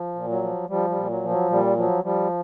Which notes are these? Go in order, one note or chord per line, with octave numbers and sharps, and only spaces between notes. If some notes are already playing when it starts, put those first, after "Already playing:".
Already playing: F3
A#2
F#3
F3
F3 G3
G3
A#2
F#3
F3
F#3
A#2 G3
F3 F#3
F3 G3